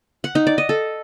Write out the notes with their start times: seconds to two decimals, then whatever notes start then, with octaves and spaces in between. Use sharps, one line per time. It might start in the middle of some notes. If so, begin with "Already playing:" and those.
0.24 F#5
0.35 D#4
0.47 D5
0.58 D#5
0.69 A4